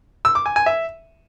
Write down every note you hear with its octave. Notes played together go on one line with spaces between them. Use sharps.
E6
D6
G#5
G#5
E5